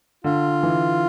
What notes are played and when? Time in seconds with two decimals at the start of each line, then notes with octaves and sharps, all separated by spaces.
0.24 D3 F4
0.63 E3